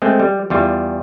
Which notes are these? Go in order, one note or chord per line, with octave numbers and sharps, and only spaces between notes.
G#3 A3 C4
G3
E2 G3 F4